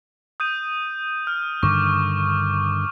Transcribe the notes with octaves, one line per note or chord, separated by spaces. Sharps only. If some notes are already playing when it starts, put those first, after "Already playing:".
D#6 G6 D#7
F6
G2 D3 D#3 C#6 D6